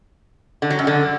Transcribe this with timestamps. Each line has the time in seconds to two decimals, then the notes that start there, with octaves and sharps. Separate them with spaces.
0.62 D3
0.70 F#3
0.79 F#2
0.87 D3